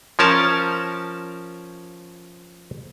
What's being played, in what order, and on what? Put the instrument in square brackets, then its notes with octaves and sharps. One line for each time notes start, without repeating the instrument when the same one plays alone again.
[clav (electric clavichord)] F3 C#4 A#4 A5